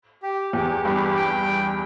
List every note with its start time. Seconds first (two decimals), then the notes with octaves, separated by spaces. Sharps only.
0.23 G4
0.53 E2 G4
0.84 G2 G4
1.16 G5